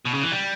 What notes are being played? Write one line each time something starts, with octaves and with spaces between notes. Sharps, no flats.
B2
C#3
E3
G3